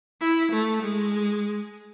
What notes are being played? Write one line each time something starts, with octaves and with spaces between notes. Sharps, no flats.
E4
A3
G#3